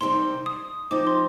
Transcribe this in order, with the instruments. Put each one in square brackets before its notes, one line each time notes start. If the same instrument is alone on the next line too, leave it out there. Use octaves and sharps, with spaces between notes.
[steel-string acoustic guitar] C3 D#3 G3 C4 D#4 [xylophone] C6
[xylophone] D#6
[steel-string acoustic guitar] F3 C4 D#4 [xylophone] D6
[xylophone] C6